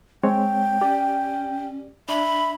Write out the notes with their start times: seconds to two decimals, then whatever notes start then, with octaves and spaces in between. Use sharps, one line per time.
0.23 G#3 C4 C#5 G5
0.81 C#4 G4 D5
2.09 D4 E5 B5